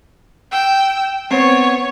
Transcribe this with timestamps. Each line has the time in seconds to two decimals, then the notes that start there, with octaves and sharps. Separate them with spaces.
0.52 G5 E6
1.31 B3 C4 C#5